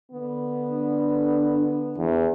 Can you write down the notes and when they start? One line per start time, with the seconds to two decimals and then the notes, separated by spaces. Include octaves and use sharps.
0.11 D3 B3
0.69 D4
1.98 E2